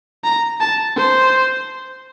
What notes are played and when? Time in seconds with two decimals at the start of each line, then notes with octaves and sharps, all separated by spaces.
0.24 A#5
0.61 A5
0.97 C5